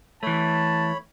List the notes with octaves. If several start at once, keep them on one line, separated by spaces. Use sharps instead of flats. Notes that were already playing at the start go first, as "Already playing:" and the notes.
E3 A3 C#5 A5 B5